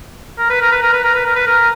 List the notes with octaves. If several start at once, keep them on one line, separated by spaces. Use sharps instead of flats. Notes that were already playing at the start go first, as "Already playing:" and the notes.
A#4
B4
A#4
B4
A#4
B4
A#4
B4
A#4
B4
A#4